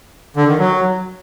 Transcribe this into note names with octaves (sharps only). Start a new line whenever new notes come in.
D3
D#3
F#3